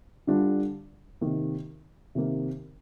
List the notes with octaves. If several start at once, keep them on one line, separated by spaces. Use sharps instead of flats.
D3 G3 D4 F4
C3 D#3 A#3
C3 D#3 A#3